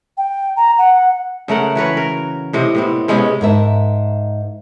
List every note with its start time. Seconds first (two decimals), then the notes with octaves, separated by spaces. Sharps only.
0.18 G5
0.57 A#5
0.78 F#5
1.48 C#3 A3 A#4 F#5
1.75 E3 F#4 B4 C#5
1.97 A#4
2.53 A2 C3 C4 D#5
2.75 A2 B3 C4
3.08 C3 G#3 B3 C#4
3.41 G#2 A#4 E5 A5